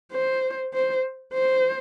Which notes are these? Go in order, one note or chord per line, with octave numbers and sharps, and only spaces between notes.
C5
C5
C5